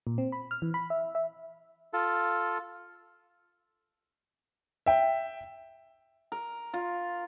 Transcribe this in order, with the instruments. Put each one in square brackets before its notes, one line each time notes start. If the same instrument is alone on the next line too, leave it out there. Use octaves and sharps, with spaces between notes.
[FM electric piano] A#2
C4
B5
F6
E3
B5
E5
E5
[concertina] F4 A4
[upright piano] E5 G5
[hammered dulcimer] A#4
F4